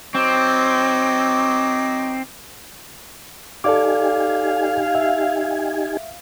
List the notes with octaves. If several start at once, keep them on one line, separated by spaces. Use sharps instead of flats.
F#3 C4 D#4 D6
D#4 G4 A4 D5 F5 G#5 D6
E5